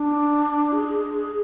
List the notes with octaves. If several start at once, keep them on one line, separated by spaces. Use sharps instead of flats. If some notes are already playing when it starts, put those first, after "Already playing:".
Already playing: D4
G#4